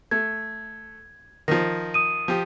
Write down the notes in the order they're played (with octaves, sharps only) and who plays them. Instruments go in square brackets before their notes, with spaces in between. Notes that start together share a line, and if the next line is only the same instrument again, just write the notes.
[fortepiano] A3 [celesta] G#6
[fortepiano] D#3 F3 [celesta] A#6
[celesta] D#6 D#7
[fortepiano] F3 G4